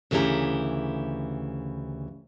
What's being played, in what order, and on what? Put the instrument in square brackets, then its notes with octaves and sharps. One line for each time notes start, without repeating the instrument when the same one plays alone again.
[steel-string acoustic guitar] D2 C#3 E3 E4 G4 A#5